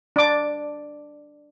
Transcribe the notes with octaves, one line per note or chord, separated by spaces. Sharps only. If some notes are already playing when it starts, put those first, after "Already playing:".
D4 D6